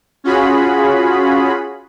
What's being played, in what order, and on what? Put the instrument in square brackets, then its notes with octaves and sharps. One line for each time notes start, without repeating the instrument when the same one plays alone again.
[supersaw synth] C#4 F4 F#4 G#4 B5